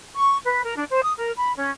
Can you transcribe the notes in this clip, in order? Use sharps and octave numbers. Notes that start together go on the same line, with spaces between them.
C#6
B4
A#4
D4
C5
D#6
A#4
B5
C#4